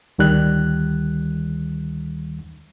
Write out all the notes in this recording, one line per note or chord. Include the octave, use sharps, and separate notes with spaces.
D2 D#3 G3 F#6